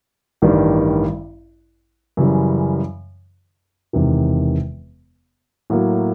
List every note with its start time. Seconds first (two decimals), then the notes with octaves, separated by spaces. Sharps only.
0.42 A1 G2 D#3 G3
2.17 F#2 C#3 E3 G3
3.93 E1 E2 C3 D#3
5.70 A2 F#3 A#3